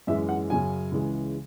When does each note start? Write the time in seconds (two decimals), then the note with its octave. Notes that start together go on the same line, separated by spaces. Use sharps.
0.07 F#2 E3 G#3 E5
0.29 F#5
0.50 F#2 C#3 F#3 G#5
0.92 C#2 C#3 E3 G#3